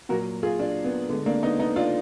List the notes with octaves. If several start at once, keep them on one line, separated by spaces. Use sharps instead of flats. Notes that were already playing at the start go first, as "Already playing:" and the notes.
A#2 F#3 F#4 A#4
F4 G#4
D4 F4
B3
D3 G#3 B3
A#3 D4
B3 D#4
B3 D#4
D4 F4